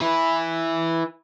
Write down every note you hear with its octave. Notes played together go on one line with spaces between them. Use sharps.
E4 B4